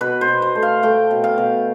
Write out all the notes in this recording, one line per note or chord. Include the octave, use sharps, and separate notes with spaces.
B2 B4
C5
B2
C5
A3
F5
A3 G5
B2
F5
B2